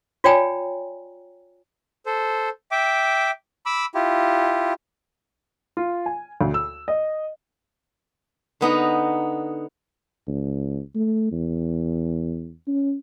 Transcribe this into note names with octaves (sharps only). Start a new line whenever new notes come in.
F4 C#5 D5 G5 G#5 A#5
A4 C5
E5 G5 D6
B5 D6 E6
E4 F4 G4
F4
G#5
D2
E6
D#5
D3 B3 D#4 A#5
C#2
A3
E2
C#4